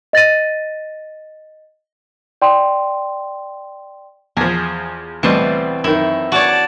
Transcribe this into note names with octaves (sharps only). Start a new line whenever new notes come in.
D#5 A6 A#6 D#7
D5 G5 C6
E2 F3 G#4
D2 B2 E3 G3 C4
F#2 D#3 E4
F#4 C#5 D5 A5